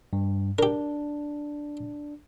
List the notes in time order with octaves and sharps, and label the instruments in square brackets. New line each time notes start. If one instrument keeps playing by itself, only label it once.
[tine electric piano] G2
[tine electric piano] D4 [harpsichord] G4 A#4